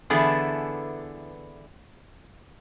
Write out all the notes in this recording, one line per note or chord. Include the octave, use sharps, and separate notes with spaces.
D3 E3 B3 E4 G#4 A4